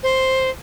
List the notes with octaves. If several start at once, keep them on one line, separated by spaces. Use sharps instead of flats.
C5